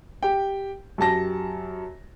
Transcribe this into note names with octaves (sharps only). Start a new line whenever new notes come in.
G4 G5
F#2 G4 A5 A#6